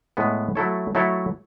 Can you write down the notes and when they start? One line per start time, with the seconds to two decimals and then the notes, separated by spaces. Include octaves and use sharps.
0.17 A2 G#3 B3
0.55 F#3 A3 E4 A4 C#5
0.95 F#3 A3 E4 A4 C#5